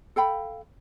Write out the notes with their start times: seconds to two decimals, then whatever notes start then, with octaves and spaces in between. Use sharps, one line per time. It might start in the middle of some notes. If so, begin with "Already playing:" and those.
0.16 A4 F5 G5 B5